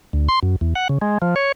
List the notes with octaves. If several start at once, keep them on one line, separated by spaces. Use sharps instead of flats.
D2
C6
F#2
E2
F#5
C#3
G#3
F3
C#5